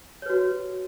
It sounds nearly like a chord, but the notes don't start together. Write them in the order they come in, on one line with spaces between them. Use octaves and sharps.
C#5 B4 F#4